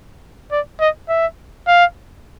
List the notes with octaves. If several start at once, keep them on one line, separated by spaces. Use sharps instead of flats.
D5
D#5
E5
F5